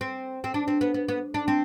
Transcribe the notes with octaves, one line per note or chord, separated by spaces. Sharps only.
C4
C4
D4
C4
B3
B3
B3
D4
C4